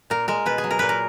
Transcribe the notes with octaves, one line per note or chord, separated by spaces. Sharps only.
A#2 A#4
G#3 A#4
B2 B4
G#4
F#3
A#4
A#2 B4
A#4